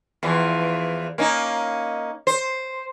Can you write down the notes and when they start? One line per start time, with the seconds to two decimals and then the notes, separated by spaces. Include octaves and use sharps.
0.23 E2 E3 F3
1.18 A#3 C#4 D#4
2.27 C5